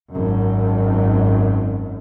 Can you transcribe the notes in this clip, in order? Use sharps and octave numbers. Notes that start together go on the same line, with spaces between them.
G#1 F#2